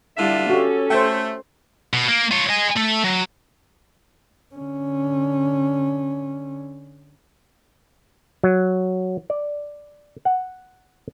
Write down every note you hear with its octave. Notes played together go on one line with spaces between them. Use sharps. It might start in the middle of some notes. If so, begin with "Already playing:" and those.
D3 G3 E4 F4 E5
C#4 F#4 G4 A4
A3 C5 G5
B2
A#3
F4 C#5
D#5 G#5
A3
F#3
D3 C#4
F#3
D5
F#5